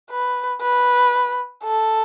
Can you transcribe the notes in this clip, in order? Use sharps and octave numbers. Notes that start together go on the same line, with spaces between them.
B4
B4
A4